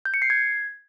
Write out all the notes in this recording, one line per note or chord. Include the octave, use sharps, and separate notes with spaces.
G6
C#7
C7
G#6